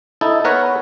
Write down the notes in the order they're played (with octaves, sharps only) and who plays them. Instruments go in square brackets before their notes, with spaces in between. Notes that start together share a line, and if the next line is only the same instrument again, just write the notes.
[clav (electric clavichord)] D#4 E4 A4
B3 A#4 B4 C#5